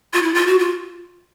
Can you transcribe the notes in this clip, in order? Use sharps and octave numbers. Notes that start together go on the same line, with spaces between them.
F4
E4
F4
F#4
F4